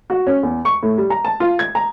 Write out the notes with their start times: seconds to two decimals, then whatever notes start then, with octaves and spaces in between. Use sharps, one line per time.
0.10 F#4
0.27 C#4
0.43 E2
0.65 C#6
0.83 A2
0.98 G3
1.10 A#5
1.24 A5
1.40 F4
1.59 G#6
1.75 A#5